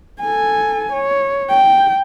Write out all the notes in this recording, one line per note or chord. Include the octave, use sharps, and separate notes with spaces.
A4 G#5
C#5
G5